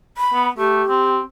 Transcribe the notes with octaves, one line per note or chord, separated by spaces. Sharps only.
B5
B3
A3 G4
C4